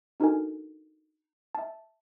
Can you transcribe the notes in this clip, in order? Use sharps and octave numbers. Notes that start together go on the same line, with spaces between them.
D4 D#4 F#4 A4 A#4 G#5
E5 A5